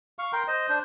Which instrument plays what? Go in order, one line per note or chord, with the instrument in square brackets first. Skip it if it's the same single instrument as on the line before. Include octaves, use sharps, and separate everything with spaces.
[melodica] F5 C#6
A#4 G5 C6
C5 D#5
D4 C5